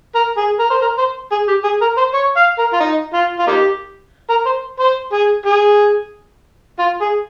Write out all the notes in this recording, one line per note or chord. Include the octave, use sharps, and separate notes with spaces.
A#4
G#4
A#4
C5
A#4
C5
G#4
G4
G#4
A#4
C5
C#5
F5
A#4
F4
D#4
F4
F4
A#3 D#4 G4
A#4
C5
C5
G#4
G#4
F4
G#4